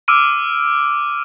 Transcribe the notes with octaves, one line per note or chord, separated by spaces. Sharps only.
D6 E6 F6 D7 D#7